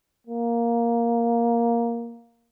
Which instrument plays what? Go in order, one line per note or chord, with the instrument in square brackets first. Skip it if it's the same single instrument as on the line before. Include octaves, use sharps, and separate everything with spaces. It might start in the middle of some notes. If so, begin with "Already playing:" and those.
[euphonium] A#3